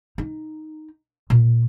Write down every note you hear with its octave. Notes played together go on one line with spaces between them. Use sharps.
D#4
A#2